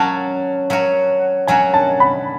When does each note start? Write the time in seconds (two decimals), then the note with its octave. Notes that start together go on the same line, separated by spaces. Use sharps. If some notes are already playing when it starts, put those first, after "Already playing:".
Already playing: F#3 C#4 F#4 A5
0.70 F#3 C#4 F#4
1.47 F#3 C#4 F#4 G#5
1.74 A5
2.00 B5